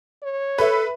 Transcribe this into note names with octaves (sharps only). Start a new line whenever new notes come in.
C#5
A4 B4 E5